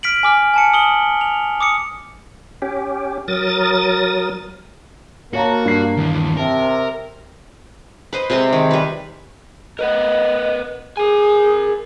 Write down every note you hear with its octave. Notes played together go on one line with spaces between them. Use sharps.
F6 B6 D7 F#7
G#5 D6 F6
G#5 A5 C#7
D#6 F#7 G7
F7
D6 D#6 C#7
C#4 G4
F#3 A#4 D#6 A6
A#3 F#4 C#5 A5 A#5
G2 C7
D#2 E3
C3 A#4 A5
B4 C5 D#5
C3 G#3 D#5 C6
D#3 G#3
G3 B4
A#4 B4 D#5 F#5
G#4 A#4 G#5